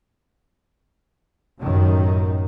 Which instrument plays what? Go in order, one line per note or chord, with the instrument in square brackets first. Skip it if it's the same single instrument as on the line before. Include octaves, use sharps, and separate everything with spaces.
[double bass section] A1 F#2 A2 D#3